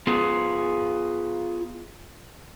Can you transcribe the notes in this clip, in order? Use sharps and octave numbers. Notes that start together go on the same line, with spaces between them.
B3 F4 G#4